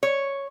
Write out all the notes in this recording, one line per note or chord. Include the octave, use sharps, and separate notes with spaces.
C#5